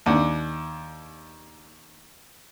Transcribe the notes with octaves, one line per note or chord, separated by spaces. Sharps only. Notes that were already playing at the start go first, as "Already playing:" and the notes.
D#2 D4 F#5